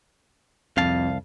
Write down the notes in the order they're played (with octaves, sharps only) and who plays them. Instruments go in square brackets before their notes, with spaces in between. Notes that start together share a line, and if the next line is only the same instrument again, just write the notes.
[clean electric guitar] C2 F5 A5 [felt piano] F2